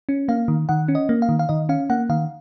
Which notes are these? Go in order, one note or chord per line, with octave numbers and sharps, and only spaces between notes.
C#4
A#3 F5
D#3
D#3 F#5
C#4
D#5
A#3
F5
D#3
F5
D#3 D#5
C#4 F5
A#3 F#5
D#3 F5